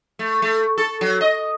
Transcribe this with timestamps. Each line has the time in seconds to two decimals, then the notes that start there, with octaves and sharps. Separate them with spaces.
0.19 A3
0.42 A3
0.78 A4
1.01 F#3
1.21 D#5